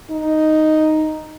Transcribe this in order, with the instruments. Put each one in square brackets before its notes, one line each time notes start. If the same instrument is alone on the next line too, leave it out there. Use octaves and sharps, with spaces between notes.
[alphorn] D#4